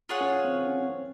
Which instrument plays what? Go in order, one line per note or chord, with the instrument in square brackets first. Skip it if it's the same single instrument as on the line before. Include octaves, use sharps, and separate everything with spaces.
[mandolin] F4 G#4 C#5 F#5
[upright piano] C#4
C4
C4
C#4
C4